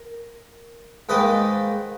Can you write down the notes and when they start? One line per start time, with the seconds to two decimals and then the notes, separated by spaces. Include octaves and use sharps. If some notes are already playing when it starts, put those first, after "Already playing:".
Already playing: A#4
1.09 G#2 D#3 A#3 B4 D#5